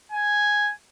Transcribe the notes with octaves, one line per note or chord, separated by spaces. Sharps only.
G#5